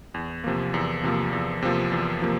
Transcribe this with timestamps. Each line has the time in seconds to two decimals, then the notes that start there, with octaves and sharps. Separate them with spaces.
0.14 E2
0.44 C3 F3 A#3
0.74 E2
1.04 C3 F3 A#3
1.33 E2
1.62 C3 F3 A#3
1.92 E2
2.22 C3 F3 A#3